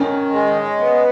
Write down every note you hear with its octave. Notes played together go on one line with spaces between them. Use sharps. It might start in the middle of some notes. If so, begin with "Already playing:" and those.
Already playing: D#3 C#4
G#3
B3